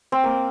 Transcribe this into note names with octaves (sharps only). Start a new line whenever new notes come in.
C4
A#3